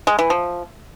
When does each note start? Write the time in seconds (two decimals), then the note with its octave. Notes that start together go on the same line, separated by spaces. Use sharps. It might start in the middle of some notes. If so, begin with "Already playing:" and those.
0.07 G#3
0.19 E3
0.30 F3